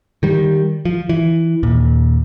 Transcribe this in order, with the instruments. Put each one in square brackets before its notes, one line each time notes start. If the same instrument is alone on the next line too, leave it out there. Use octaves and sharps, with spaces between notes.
[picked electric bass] D#3 G3
F3
E3
D#2 A#2